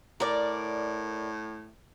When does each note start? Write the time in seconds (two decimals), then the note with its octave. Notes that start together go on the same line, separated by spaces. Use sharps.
0.20 A2 A#4 D5